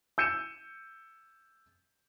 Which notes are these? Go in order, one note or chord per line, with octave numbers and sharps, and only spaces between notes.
E6 G6 C#7 D#7 E7